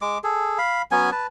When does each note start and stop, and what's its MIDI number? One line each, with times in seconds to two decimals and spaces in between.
0.02 0.18 56
0.02 0.18 86
0.24 0.58 68
0.24 0.58 69
0.58 0.82 77
0.58 0.82 83
0.91 1.10 54
0.91 1.10 59
0.91 1.10 61
0.91 1.10 80
1.12 1.27 71
1.12 1.27 81